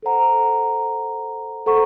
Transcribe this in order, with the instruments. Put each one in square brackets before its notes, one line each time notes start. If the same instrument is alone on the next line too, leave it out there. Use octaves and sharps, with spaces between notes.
[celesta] A4 C5 F#5 A#5
A4 C5 F#5 A#5 C#6